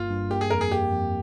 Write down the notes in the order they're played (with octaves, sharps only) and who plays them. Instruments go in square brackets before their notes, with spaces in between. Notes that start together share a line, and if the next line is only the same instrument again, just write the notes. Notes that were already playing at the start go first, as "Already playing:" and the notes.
Already playing: [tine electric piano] G1 G2 A#3 [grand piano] F4
[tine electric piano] G2
[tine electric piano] A#3 [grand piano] G4
[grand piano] G#4
[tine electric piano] F2 [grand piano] A#4
[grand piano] G#4
[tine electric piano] A#3 [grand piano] G4
[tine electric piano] F2